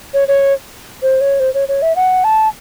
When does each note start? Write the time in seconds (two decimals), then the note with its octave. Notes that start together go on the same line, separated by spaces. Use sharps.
0.14 C#5
0.28 C#5
1.03 C5
1.21 C#5
1.40 C5
1.54 C#5
1.68 C#5
1.82 E5
1.96 F#5
2.24 A5